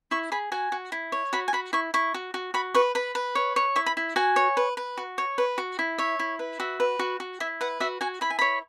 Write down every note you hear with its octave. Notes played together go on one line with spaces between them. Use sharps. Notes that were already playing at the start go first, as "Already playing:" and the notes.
E4 C#6
G#4 B5
F#4 G#5
F#4
E4
C#5
F#4 B5
G#5
F#4 B5
E4 C#6
E4 C#6
F#4
F#4
F#4 B5
B4 C#6
B4 B5
B4
C#5
C#5
E4 C#6
B5
E4
F#4 G#5
C#5
B4
B4
F#4
C#5
B4
F#4
E4
C#5 E5
E4
B4
F#4 E5
B4
F#4
F#4
E4 E5
B4 F#5
F#4 E5
F#4 G#5
E4 B5
G#5
C#5 B5